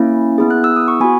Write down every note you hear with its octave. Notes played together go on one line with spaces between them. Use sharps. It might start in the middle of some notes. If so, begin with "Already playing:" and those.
Already playing: A#3 C#4 E4
B3 E4 G#4
F#6
E6
D#6
C#6
B3 F#4 G#5 B5